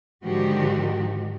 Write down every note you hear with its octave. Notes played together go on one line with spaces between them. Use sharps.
G#2 D3 D#3 F3 F#4 G4